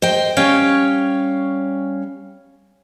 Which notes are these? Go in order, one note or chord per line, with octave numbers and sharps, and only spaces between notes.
C5 D#5 G5
G3 C#4 C#5 F5 G5